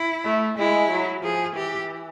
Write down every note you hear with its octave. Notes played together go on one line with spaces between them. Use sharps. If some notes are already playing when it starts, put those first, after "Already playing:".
Already playing: E4
A3
G#3 E4
F#3
F3 G#4
E3 G4